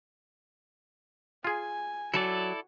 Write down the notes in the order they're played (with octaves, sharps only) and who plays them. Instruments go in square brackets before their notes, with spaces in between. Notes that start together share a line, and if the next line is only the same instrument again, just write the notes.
[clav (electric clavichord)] F4 G#4 [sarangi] G#5
[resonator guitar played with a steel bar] F#3 [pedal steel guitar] E4 A4 D5